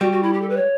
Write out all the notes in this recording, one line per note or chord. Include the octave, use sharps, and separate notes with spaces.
G3 F#4
F#4
E4
G4
A4
B4
C#5